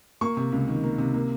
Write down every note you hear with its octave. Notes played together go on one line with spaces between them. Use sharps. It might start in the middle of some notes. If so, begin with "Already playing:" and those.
A#3 C#6
C3
C#2
D#3
A#3
C3
A#3